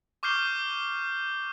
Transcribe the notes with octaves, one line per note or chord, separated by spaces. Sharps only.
C#6 D6 F6 G6 C7 G7